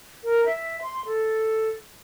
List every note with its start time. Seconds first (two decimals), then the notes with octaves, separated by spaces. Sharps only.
0.24 A#4
0.46 E5
0.82 C6
1.06 A4